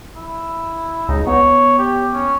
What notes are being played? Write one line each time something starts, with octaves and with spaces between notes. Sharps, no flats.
E4
C#2 D#4
B3 C#5
G4
C#4